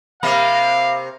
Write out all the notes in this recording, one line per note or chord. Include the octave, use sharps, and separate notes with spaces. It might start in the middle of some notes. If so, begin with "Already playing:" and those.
C3 A#3 E5 F5 B5